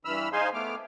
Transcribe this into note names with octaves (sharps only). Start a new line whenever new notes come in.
G2 E3 B5 E6 F6
D#4 G#4 C5 F5 G#5 C6
A3 B3 D6 F6